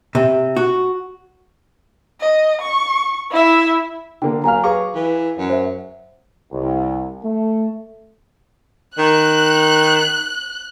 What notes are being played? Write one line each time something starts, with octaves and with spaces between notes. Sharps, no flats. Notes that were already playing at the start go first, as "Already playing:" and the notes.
C3
F#4
D#5
C#6
E4 E5
D3 A#3 G5
F#3 A#3 F5 G#5 A#5 F6
G#4 B4 F5 A#5 C#6 D6
E3
F#2
C5 E5
C2
A3
D#3 F#6